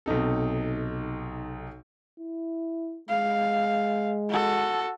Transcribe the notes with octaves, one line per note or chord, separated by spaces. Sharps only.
B1 C3 D#4 A4
E4
G#3 F5
F#4 A4